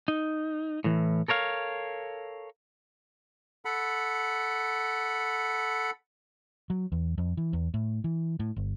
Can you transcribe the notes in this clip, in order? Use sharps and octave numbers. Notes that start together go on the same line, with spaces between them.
D#4
A2 E3
A4 A#4 C#5 F5
A4 F#5 B5
F#3
E2
F2
E3
E2
A2
E3
A2
G1